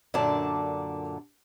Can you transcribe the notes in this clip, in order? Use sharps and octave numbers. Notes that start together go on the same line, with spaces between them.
F#2 A#2 D3 D4 D5 A5